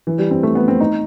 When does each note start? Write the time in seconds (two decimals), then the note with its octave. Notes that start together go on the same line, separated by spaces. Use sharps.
0.07 E3
0.18 G3
0.31 C4
0.43 A3
0.55 B3
0.68 C4
0.80 D#4